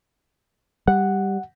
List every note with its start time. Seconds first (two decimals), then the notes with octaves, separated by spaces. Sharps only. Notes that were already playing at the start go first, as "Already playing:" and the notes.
0.88 G3 F#5